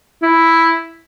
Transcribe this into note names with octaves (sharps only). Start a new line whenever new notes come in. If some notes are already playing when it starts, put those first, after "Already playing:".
E4